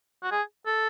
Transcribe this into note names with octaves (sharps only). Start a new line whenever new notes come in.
F#4
G#4
A4